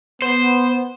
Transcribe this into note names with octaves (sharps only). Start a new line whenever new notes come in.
B3 C5